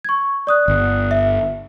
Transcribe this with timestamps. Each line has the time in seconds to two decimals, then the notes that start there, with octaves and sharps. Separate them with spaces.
0.05 C#6 G#6
0.47 D5 D#6 F#6
0.68 G1
1.11 E5